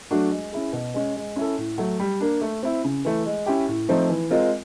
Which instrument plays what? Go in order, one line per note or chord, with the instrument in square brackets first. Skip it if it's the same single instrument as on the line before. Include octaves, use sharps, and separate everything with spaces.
[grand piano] F#3 A3 D4 F#4
G#3
C#4 E4 G#4
B2
G#3 C#4
G#3
C#4 E4 A4
A2
F#3 A3
G3
A#3 D4
A3
C4 E4
C#3
E3 A3
G#3
C#4 E4 G4
A2
F3 A3 C4 D#4
E3
G#3 C4 F4 A#4